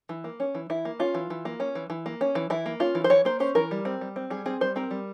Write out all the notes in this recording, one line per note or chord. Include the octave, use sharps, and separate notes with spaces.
E3
A#3
C#4
E3
E3 E4
A#3
C#4 F4
E3
E3
A#3
C#4
E3
E3
A#3
C#4
E3
E3 E4
A#3
C#4 F4
E3
C5
E3 C#5
A#3 C5
C#4 C5
E3 A#4
G3
C4
G3
C4
G3 G#4
C4 G#4
G3 C5
C4 A#4
G3